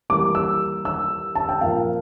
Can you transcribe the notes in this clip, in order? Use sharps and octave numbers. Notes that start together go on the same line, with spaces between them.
E3 G3 A#3 D6
E6
E6
A5
G5
A#2 F3 A#3 F5